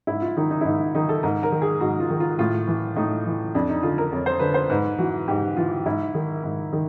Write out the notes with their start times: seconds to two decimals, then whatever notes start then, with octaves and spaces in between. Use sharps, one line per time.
0.07 G#2 E4
0.22 F4
0.37 D#3 D#4
0.51 D#4
0.61 E4
0.65 G#2 D#4
0.95 D#3 D#4
1.09 A4
1.23 G#2 A#4
1.43 A#4
1.52 D#3
1.62 G#4
1.81 G#2 F#4
2.00 F4
2.10 D#3
2.20 F4
2.39 A2 F4
2.67 E3
2.96 A2 D#4
3.26 E3
3.55 F2 D4
3.69 D#4
3.83 D3 F4
3.98 A#4
4.12 F2 C#5
4.26 C5
4.40 D3 B4
4.54 C5
4.70 G#2 B4
4.98 E3 F#4
5.28 G#2 G4
5.56 E3 F4
5.86 G#2 E4
6.15 D#3
6.44 G#2
6.73 D#3